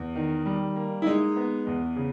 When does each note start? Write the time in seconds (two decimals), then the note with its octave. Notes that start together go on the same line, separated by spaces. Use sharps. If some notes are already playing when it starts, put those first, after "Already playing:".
Already playing: E2
0.16 D#3
0.46 G3
0.76 A#3
1.02 E4
1.06 G#3 D#4
1.36 B3
1.67 E2
1.96 C#3